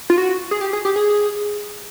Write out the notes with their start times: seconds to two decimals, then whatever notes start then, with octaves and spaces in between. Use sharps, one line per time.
0.10 F4
0.18 F#4
0.51 G#4
0.61 G4
0.73 G#4
0.85 G4
0.96 G#4